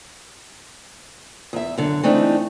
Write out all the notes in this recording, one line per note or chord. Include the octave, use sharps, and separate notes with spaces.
E2 E5
F#2 D3
E3 A3 C4 D4 D#4